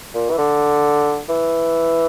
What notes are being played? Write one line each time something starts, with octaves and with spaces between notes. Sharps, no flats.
A#2
E3
D3
E3